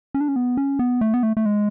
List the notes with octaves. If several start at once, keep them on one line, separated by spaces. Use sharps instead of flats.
C#4
D4
C#4
B3
C#4
B3
A3
B3
A3
A3
G#3